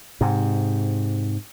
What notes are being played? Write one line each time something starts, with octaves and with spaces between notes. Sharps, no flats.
G#2 C3